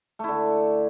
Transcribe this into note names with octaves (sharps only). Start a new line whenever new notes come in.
D3 A3 E4